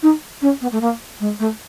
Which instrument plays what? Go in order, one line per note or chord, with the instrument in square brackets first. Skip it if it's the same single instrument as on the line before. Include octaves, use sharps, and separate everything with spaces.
[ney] D#4
C#4
B3
A3
A#3
G#3
A3